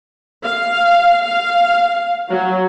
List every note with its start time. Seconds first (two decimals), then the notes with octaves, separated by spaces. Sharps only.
0.43 F5
1.23 F5
2.30 F#3